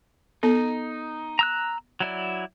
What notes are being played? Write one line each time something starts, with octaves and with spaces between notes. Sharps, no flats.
B3 D#4 A4
A#5 E6 F#6
F#3 E4 D5